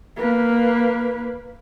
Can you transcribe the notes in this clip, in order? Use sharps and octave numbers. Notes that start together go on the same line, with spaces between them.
A#3 B4